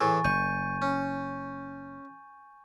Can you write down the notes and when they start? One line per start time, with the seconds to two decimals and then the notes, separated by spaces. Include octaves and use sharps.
0.01 A2 E3 G#4 G#5 C#6 A6
0.24 F#1 C#6 G6 D#7
0.82 C#4